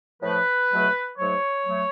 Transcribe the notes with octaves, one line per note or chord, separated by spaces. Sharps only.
A2 F3 A3 B4
C#2 B2 F#3 A3
G#2 F#3 A3 C#5
F#3 A3